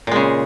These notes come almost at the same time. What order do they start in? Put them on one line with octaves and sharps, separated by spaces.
A#2 G#3 C#3